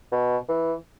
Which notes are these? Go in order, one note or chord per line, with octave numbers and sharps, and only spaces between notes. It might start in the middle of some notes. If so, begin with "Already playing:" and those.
B2
E3